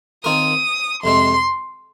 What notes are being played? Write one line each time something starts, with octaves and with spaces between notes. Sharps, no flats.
D#3 C4 F4 A#4 D#6
F2 C3 G#3 C4 C6